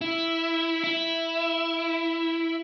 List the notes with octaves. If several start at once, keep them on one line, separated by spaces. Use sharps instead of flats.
E4
E4